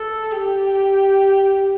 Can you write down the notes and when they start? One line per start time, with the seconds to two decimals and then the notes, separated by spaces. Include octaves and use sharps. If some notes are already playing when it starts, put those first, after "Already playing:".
Already playing: A4
0.31 G4